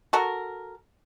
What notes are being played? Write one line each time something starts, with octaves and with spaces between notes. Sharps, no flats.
F#4 A4 A#4